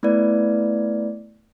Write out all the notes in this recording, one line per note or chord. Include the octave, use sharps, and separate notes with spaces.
A3 B3 E4 B4 D5